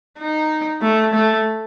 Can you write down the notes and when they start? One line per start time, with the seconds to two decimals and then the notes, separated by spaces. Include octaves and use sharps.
0.19 D#4
0.82 A3
1.13 A3